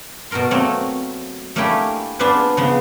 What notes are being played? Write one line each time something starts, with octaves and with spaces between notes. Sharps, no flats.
B2 F#4 A4 A#4 C6
F#3 A3 A#3 C4 C#5
A3 A#3 C#4 D4 E4 G4
B3 D4 F4 G#4 B4 C5
C#3 F3 G#3 B3